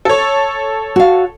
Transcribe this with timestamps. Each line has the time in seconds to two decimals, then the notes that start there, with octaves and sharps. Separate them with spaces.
0.05 A4 C#5
0.96 F#4 F5